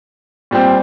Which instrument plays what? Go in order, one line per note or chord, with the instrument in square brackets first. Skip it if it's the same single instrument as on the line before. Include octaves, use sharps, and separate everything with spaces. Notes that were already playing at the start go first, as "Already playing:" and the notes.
[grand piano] A#2 G3 C4